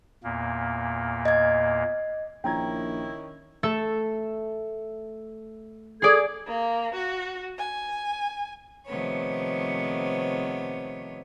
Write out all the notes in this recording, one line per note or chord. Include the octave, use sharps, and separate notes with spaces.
E2 A#2 A#3
D#5 G#6
A#1 D#3 C#4 E4 G5 A#5 G#6
A3 A4 E5
G#4 A4 D5 D#6 G#6
A#3
F#4
G#5
C3 D#3 F3 A3 B3 C#5